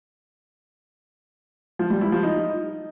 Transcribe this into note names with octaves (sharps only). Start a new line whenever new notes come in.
F3
G3
E4
F3
D#4